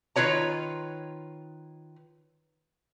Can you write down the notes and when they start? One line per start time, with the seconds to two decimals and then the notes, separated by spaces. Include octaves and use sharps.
0.16 D#3 F4 B4 C#5 A#5